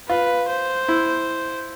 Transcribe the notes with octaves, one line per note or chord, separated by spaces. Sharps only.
F4 B4
C5
E4